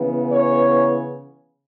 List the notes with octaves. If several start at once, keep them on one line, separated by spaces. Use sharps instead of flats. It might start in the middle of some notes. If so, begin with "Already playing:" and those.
Already playing: C#3 E3 B3
C#5